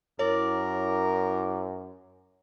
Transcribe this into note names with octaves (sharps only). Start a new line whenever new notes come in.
F#2 E4 A#4 C#5 D6